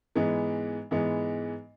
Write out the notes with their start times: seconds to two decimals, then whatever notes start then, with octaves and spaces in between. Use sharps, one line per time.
0.15 G#2 E3 G#3 B3
0.91 G#2 E3 G#3 B3